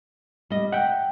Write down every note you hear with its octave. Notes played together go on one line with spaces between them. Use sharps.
G3 D#5
E5 F#5 G5